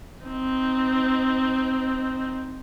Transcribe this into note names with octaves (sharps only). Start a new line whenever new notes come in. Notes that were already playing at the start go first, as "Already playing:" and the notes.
C4 D#4